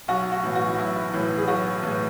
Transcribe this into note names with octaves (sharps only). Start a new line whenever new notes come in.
B1 F#4
F#4
A2 E3
F#4
B1 E4
A2 E3
G#4
B1 F#4
A2 E3